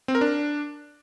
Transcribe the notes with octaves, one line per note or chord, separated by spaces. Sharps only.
C4
A#4
D4